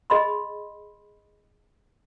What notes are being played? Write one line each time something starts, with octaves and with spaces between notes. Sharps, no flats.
G#4 D#5 B5 C6